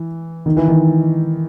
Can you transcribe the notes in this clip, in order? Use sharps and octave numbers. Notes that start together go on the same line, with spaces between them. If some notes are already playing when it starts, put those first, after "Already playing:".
Already playing: E3
D#3
E3
D#3